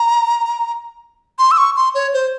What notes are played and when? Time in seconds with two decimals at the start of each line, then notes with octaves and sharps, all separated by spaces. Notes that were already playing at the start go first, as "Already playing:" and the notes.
Already playing: A#5
1.39 C6
1.51 E6
1.58 C#6
1.76 C6
1.95 C#5
2.13 C5